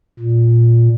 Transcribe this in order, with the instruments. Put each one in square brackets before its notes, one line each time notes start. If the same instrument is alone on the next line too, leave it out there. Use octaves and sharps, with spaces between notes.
[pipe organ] A#2